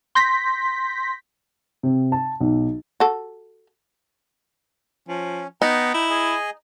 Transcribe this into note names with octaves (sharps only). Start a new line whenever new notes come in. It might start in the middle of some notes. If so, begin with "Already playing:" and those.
C6 G6 A#6 B6
C3
A5
B1
F#4 A4
F3 C#4
B3 D#4 G5 A#5
E4
G#4 D#5 G#5